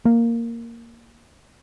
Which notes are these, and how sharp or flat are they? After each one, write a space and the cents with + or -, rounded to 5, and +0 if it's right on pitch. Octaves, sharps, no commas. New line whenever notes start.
A#3 -5